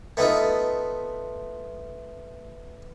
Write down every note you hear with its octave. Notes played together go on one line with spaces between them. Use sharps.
A3 B3 D#4 F4